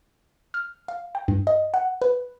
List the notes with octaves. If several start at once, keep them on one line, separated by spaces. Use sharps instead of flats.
F6
F5
G5
G2
D#5
F#5
B4